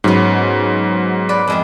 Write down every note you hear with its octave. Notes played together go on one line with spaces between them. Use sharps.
G#2 F#3 B3 C#4
B4 D5
F2 G#3 E5